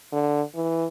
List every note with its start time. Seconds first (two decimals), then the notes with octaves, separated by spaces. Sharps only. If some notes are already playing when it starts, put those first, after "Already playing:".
0.12 D3
0.55 E3